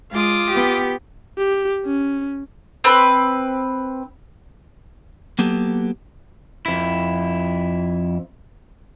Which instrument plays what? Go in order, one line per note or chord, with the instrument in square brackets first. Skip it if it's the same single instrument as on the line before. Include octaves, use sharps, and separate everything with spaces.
[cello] G#3 [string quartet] F4 D6 D#6
[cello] B3 G4
[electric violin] G4
C#4
[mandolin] C4 B4
[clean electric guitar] F#3 A#3 B3 G4 A4
[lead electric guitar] F2 E4